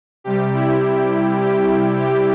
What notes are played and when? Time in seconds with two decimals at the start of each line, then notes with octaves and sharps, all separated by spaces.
0.24 C3 G3 G4
0.53 E4
1.41 G4
2.00 G4